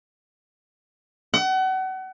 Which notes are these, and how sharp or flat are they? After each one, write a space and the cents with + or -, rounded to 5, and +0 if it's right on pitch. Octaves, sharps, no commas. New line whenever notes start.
F#5 +35